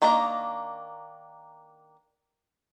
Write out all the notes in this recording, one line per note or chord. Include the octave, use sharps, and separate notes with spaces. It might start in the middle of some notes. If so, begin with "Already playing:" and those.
D#3 A#3 D4 D#5 A#5